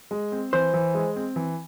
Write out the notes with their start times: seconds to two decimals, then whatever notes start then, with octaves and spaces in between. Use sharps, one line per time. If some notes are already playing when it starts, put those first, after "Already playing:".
0.11 G#3
0.32 C4
0.53 E3 C5
0.74 E3
0.94 G#3
1.16 C4
1.36 E3